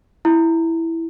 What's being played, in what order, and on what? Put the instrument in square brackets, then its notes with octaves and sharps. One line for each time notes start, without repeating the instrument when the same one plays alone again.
[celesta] E4